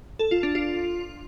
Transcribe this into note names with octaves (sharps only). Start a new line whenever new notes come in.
A4
F4
D4
F4